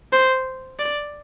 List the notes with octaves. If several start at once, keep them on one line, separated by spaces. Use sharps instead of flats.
C5
D5